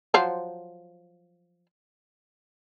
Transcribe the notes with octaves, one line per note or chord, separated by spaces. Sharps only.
F3 F#3 C5